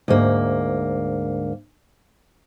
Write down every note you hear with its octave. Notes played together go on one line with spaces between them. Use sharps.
D2 G#2 A#3